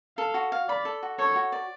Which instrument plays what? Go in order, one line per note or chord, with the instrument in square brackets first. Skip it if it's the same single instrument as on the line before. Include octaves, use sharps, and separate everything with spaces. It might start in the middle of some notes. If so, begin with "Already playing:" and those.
[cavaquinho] A4 [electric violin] F5
[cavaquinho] F#4
F5
[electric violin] D5 [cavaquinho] B5
[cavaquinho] A4
F#4
[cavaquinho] A4 [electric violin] C#5
[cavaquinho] F#4
D5